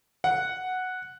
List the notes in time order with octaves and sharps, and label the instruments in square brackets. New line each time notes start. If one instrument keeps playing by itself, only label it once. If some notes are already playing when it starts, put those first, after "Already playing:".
[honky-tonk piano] F#5